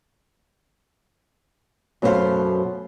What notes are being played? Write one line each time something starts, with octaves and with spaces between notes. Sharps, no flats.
F#2 B2 A3 B3 C5 F5